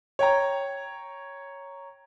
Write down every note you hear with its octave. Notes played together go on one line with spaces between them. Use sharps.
C#5 G5 A#5